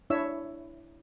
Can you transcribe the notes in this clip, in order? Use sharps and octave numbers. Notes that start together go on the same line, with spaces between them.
D4 E4 C#5 E5 E6